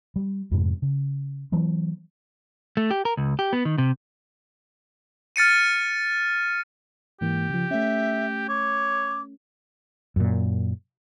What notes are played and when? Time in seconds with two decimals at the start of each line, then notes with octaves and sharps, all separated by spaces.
0.16 G3
0.51 F2 G#2 C3 G#3
0.82 C#3
1.52 E3 F#3 B3
2.77 A3
2.91 G4
3.05 A#4
3.17 C#2
3.39 G4
3.53 B3
3.65 D#3
3.78 C3
5.36 F6 A6 C#7 D#7
7.21 G#2 E3 A#3 G4
7.50 C#3 F3
7.71 A3 C#4 E5
8.48 C#5 D6
10.16 F#2 A#2